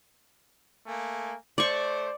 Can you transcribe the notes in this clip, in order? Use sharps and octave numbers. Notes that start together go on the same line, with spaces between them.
A3 A#3 G#5
A3 C5 D5 C#6